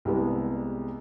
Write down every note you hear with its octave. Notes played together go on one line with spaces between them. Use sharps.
C2 C3 G3 G#3 B3